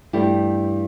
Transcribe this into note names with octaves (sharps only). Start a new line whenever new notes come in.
G2 E3 A3 E4 G4